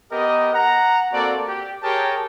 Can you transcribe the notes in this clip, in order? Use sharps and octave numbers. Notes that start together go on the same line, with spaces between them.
B3 G4 A#4 D#5
F#5 A#5
A#3 C4 F#4 A4 D5
G4
G4 G#4 A#4 C#5 G5 A5